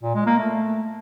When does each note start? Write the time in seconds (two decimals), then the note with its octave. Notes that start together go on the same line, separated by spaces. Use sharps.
0.03 A#2
0.15 G#3
0.26 A#3
0.38 A3